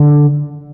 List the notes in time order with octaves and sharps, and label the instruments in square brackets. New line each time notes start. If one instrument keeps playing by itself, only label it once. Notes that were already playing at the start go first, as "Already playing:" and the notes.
Already playing: [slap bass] D3